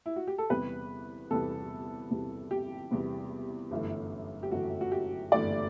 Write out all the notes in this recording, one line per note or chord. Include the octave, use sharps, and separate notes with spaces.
E4
F#4
G4
A4
E2 C3 G3 B3 B4
E2 C3 G3 B3 A4
E2 C3 G3 B3
G4
E2 C3 G3 B3
G1 F#2 E3 A3
G4
G1 F#2 E3 A3 F#4
F#4
G4
G1 F#2 E3 A3 D5